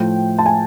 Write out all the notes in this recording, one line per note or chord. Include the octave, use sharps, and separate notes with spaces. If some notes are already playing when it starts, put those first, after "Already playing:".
Already playing: A2 F3 A3 G5
A5
G#5